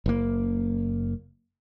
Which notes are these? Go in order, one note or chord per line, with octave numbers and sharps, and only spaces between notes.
F#1 A#3